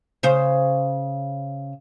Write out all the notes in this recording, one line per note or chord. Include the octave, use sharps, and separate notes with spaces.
C#3 C5